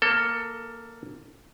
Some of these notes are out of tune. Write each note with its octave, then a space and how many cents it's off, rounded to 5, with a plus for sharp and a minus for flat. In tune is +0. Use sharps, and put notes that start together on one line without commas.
A#3 +0 A4 +20